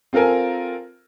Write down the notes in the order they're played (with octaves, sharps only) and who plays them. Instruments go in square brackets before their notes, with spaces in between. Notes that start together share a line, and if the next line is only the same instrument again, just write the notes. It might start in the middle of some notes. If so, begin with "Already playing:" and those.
[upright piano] C4 F4 A4 A#4 G#5